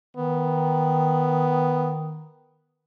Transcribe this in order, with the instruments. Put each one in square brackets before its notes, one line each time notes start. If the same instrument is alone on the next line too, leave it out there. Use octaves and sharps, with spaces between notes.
[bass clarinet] D#3 [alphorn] B3